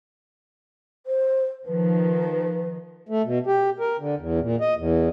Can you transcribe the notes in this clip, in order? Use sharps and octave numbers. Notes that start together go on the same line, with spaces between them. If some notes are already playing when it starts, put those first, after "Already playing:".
C5
D#3 F3 B4
A3
B2
G4
A#4
D3
E2
A#2
D#5
E2